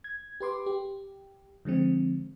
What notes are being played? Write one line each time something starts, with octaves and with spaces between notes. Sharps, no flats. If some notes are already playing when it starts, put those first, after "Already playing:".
G#6
G4 B4 C6 D6
G4
D3 F3 G#3 C4